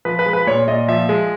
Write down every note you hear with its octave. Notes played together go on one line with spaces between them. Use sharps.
F3 B4
B4
G#3
B4
A#2 C#5
A#2 D#5
F3 E5
G#3